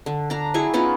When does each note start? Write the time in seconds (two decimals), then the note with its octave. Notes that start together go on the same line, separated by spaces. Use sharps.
0.06 D3
0.30 D4 A#5
0.54 F#3 E4 G#4 C#6
0.74 B3 C#4 D#4 F4